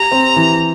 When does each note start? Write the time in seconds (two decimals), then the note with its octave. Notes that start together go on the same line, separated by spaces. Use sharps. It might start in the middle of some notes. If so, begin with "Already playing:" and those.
Already playing: G4 A#5
0.12 C4
0.36 E3